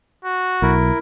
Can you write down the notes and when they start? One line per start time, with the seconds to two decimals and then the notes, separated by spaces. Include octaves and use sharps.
0.25 F#4
0.62 B1 E4 A#4